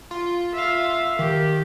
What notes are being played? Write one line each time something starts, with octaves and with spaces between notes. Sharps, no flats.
F4
E5 F5
D#3 G4